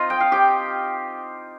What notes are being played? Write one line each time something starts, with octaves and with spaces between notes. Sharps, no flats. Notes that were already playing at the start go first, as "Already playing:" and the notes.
Already playing: C4 D#4 F4 D#5
G5
F5
G4 G5